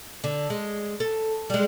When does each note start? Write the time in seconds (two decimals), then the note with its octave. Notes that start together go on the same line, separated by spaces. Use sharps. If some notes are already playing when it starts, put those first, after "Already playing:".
0.24 D3
0.50 G#3
1.00 A4
1.50 G3 G#3